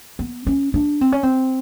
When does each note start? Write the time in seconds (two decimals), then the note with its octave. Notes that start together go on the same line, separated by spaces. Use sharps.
0.19 B3
0.47 C#4
0.74 D4
1.01 C4
1.12 C#4
1.23 C4